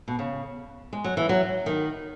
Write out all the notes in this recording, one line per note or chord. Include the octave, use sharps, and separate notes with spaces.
B2
C#3
G#3
F#3
E3
F#3
D#3